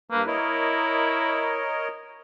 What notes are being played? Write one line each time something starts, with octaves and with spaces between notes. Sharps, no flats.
G2 A#3 B4
E4 A#4 C#5 D#5